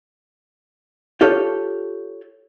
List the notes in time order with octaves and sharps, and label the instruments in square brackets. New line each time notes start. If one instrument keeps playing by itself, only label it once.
[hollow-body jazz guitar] F4 G4 A4 C#5